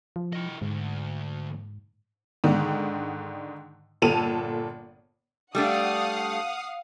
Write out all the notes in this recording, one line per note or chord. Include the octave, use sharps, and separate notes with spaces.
F3
E3 D#5
D2 G#2
G#2 D3 D#3
G1 A#2 A4 A5 D#7 F7
G3 A3 D4 F5 F#5 D#6